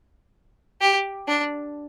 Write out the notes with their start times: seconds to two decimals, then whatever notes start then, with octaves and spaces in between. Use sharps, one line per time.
0.81 G4
1.28 D4